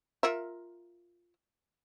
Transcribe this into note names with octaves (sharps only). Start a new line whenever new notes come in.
F4 A#4 E5